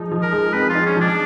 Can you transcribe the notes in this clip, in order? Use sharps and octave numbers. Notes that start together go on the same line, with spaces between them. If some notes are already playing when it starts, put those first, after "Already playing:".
Already playing: F3 G#3 D#4
F3
A#4
G#3
C4 B4
F4
D#4
C#4
F3 D4